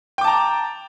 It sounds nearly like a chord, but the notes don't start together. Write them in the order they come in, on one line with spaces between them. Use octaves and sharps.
G5 D6 A5 A#5